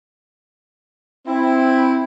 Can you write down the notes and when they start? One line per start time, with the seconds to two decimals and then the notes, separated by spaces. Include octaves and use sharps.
1.27 C4 E4